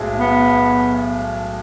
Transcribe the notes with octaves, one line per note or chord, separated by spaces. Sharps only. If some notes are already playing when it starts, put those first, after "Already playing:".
Already playing: B1 A2 G#3
B3